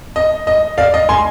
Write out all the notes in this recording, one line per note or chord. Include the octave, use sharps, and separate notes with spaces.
D#5
D#5
D5 F5
D#5
G#5 C6